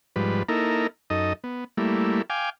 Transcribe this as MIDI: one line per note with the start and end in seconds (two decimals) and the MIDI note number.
0.16 0.43 44
0.16 0.43 53
0.16 0.43 55
0.16 0.43 71
0.49 0.87 58
0.49 0.87 63
0.49 0.87 64
0.49 0.87 69
0.49 0.87 70
1.10 1.33 42
1.10 1.33 63
1.10 1.33 69
1.10 1.33 75
1.44 1.64 59
1.78 2.22 55
1.78 2.22 57
1.78 2.22 58
1.78 2.22 64
2.30 2.50 77
2.30 2.50 79
2.30 2.50 80
2.30 2.50 86